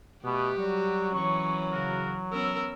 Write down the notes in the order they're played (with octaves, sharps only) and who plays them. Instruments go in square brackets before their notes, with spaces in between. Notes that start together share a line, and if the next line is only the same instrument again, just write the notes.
[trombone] B2 [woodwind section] A3 B3 [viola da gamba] G4
[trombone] F#3 [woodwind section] G3 F#4
[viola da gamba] E3 C#4 [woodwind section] C#6
[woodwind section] C#3 F#4 A#4
[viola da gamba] B3 C#4 A#4 [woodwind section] E6